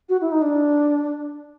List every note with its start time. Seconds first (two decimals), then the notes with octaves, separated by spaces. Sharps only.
0.09 F#4
0.21 E4
0.32 D#4
0.42 D4